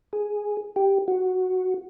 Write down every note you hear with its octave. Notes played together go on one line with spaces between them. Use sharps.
G#4
G4
F#4